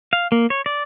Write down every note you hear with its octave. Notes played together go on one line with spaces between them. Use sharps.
F5
A#3
C#5
D5